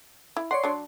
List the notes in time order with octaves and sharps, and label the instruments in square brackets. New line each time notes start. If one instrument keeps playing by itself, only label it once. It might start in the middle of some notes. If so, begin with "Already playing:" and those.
[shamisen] E4
[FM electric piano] C#5 D5 C6 [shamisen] F#5
[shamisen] F#3 D4